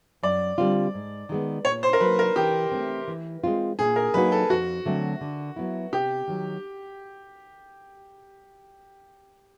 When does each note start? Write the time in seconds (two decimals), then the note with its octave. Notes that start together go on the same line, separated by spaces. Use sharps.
0.23 F#2 D5
0.58 D3 G3 C4 F4
0.94 G#2
1.29 D#3 G#3 B3
1.65 A#2 C#5
1.83 C5
1.93 A#4
2.00 F#3 A#3 B4
2.19 A#4
2.36 E3 G4
2.72 A3 C4
3.08 E3
3.44 G#3 C4 F4
3.79 A#2 G#4
3.96 A#4
4.14 F#3 A#3 D#4 F#4 B4
4.32 A4
4.50 F2 F#4
4.85 D3 F#3 A3 C4
5.21 D3
5.56 F#3 B3 E4
5.93 C3 G4
6.27 D#3 F#3